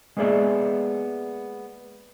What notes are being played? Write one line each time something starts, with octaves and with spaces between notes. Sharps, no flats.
G#3 A#3 B3 G#4 D5 E5